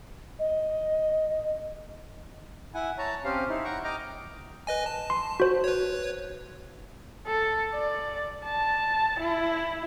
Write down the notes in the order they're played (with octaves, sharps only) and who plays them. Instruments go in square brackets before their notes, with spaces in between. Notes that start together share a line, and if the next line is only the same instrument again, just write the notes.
[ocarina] D#5
[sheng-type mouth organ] E4 F#5 G#5
C#5 A5 A#5
C4 C#4 G4 F5
D#4 E4
F#5 G5 A#5 C#6
D#5 G5 A#5 D6 F6
[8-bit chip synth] B4 D#5 G#5
A5
[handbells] C6
F#4 C5
[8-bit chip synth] B4 C#5
[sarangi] A4
D5
A5
E4